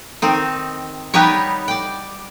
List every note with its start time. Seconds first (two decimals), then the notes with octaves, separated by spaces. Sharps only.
0.22 D#3 C4 D#4
1.14 G3 B3 D#4 G4 C#5
1.68 D5 G5